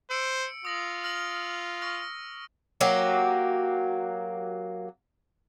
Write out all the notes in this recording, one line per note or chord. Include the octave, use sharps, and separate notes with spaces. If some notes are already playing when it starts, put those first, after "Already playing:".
C5 E6 C#7 D7
F4 D#6 A#6 F#7
F6 A#6 F#7
C#6 F6 A#6
F#3 A#3 G4